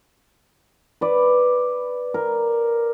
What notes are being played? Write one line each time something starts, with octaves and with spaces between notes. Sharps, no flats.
B4 D5
A#4